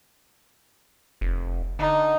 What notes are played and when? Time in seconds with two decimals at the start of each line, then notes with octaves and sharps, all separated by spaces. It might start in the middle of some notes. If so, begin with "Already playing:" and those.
1.21 F1
1.79 D3 D#4